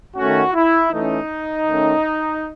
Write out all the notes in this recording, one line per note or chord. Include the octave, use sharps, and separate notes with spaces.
D#3 A3 C#4 F#4
E4
E3 A3 C#4 D#4
D#3 A3 C#4